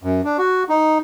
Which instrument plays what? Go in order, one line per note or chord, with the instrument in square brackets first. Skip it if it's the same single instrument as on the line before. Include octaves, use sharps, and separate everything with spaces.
[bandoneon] F#2
D4
F#4
D#4